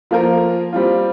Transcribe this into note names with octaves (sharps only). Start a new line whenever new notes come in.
F3 A#3 F4 A#4
G3 C4 F4